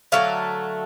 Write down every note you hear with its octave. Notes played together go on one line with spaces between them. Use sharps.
D3 F#3 A3 F5